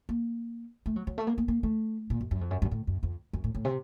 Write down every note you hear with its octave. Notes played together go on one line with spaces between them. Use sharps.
A#3
A3
F#3
F#3
A3
A#3
A#3
A#3
A3
A#2
F#2
F#2
F2
F#2
F#2
A2
F#2
F2
F#2
A2
A2
C3